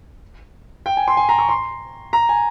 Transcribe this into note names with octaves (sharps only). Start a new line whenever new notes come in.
G5
G#5
C6
G#5
A#5
C#6
C6
A#5
G#5